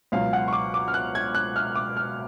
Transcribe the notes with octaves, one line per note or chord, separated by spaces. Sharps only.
C#2 B2 F#3 F5
F#5
C#6
D6
D6
F6
F#6
G#6
F#6
F6
D6
F6